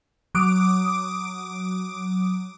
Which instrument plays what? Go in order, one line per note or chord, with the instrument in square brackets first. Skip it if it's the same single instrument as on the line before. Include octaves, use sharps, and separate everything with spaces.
[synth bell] F#3 D6 D#6 D7